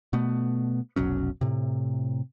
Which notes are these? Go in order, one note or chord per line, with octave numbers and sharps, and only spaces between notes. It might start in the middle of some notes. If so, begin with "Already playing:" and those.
B2 A3 B3
F1 B1 F#3 C#4
A2 C3